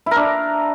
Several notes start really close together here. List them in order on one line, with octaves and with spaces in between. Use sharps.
E4 A#4 D4